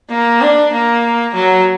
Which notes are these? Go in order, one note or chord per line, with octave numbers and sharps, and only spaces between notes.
A#3
D4
A#3
F#3